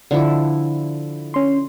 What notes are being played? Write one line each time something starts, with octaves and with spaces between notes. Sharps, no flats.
D3 F3 E4
C#4 C6